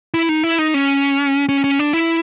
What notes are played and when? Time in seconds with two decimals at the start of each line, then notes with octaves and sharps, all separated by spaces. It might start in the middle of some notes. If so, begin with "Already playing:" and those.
0.14 E4
0.29 D#4
0.44 E4
0.59 D#4
0.74 C#4
1.49 C#4
1.64 C#4
1.79 D4
1.93 E4